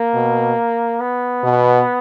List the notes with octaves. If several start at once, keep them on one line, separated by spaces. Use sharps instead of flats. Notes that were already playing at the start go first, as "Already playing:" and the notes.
Already playing: A#3
B2
B3
B2